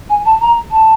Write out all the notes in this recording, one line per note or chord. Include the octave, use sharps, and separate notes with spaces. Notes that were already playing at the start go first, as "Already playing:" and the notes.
G#5
A5
A#5
A5